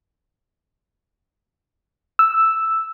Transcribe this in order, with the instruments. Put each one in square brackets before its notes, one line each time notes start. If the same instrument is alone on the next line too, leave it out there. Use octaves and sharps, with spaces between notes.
[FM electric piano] E6